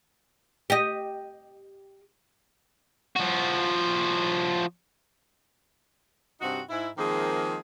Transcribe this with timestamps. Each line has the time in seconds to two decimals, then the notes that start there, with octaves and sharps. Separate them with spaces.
0.70 G4 D#5
3.16 F3 F#4
6.41 G2 C3 C4 D#4 F#4
6.69 G#2 E4
6.96 D#3 F3 G#3 A#3 C4 G#4